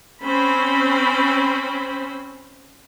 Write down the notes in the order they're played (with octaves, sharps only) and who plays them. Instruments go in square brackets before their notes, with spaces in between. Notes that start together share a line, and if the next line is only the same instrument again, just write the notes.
[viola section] C4 C#4 C5 B5